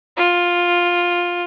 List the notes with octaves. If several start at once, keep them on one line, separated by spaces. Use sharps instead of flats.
F4